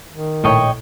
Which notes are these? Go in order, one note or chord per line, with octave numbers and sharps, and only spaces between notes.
D#3
A#1 A2 C#5 D#5 G5